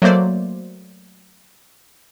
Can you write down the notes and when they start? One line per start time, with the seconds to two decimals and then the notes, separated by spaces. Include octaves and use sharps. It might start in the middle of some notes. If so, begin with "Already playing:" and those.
0.02 F#3 A3 A#3 C5 D5